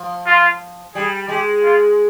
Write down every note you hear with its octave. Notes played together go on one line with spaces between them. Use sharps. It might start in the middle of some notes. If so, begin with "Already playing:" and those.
Already playing: F3
F4
G3 G#4
G#3 G4
F4